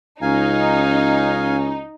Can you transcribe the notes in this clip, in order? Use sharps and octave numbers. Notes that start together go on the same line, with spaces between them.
C#2 C#4 D#4 F5 G#5